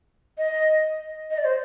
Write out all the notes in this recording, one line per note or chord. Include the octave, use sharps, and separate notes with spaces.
D#5
D#5
D5
C5